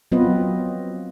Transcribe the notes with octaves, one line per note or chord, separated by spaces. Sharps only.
F#3 B3 C4 F4 B4 D#5